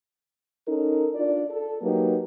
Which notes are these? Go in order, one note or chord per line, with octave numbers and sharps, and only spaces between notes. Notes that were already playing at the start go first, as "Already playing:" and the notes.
C#4 D#4 A4 A#4
D4 F4 D5
A4
F#3 A#3 D#4 G4 B4